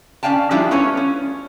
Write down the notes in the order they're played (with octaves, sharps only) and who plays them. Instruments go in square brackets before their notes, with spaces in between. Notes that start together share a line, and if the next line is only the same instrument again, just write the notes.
[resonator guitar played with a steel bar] C#4 D5 F5 G5 A5
F3 G3 G#3 D4 E4 F4
A3 B3 C#4 F4 A4 C#5
C#4